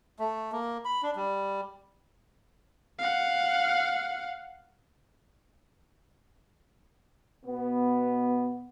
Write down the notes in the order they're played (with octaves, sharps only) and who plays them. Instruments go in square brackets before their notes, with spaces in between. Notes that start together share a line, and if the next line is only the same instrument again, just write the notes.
[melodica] A3
A#3
B5
D4
G3
[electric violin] F5 F#5
[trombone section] B2 B3